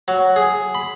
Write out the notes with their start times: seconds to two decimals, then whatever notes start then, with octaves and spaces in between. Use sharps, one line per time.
0.08 F#3
0.36 G#4
0.75 B5